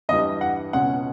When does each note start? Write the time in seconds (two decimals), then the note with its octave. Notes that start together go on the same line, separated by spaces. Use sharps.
0.09 G2 E3 G3 D#5
0.41 F#5
0.73 C#2 B2 G#3 C#4 F#5